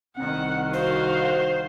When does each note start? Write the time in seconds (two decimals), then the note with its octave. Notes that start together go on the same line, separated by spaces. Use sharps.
0.17 C2 D#3 C4 F#5
0.73 F#4 C5 F5 C7